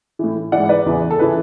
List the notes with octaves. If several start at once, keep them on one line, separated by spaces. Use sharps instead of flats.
A2 E3
G#2 E3 D5 F#5
B4 D5
E2 C#3 E3
A4
C#3 E3 B4